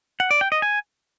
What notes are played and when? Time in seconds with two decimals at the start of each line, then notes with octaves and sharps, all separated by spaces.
0.20 F#5
0.31 D5
0.41 G5
0.52 D#5
0.62 G#5